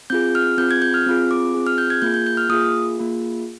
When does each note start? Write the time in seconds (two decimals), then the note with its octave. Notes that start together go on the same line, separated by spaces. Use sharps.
0.10 C4 F4 G#4 G6
0.35 F6
0.58 C4 F4 G#4 G6
0.71 G#6
0.82 G6
0.94 F6
1.06 C4 F4 G#4
1.31 D6
1.54 C4 F4 G#4
1.67 F6
1.78 G6
1.90 G#6
2.02 A#3 F4 G#4 G6
2.14 G6
2.27 G6
2.37 F6
2.49 A#3 F4 G#4 D#6
2.98 A#3 F4 G#4